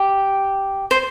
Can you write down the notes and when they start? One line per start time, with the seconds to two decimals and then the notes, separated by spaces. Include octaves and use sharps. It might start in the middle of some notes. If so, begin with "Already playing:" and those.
Already playing: G4
0.91 C5